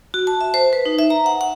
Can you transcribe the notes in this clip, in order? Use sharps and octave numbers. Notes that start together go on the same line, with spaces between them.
F#4
A5
E5
C5
B4
D#4
E5
A#5
F#5
F#5